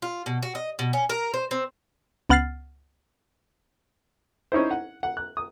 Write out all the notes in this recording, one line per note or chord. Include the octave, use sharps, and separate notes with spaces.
F4
B2
F#4
D#5
B2
C#4
A#4
C5
C4
C#2 B3 F#5 F6 A6 C7
C#4 D#4 E4 C5
F#5
F#5
F#6
D#6